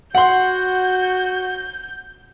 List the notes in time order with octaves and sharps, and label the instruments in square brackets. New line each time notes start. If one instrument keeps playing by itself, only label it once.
[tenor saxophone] F#4 [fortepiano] F#5 C6 [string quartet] G6